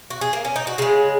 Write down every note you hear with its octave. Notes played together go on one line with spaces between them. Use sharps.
F#4
G#4
A#3
C#4
D#4
F#4
C#3 G#3 G#4